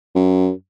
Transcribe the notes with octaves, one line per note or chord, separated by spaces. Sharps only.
F#2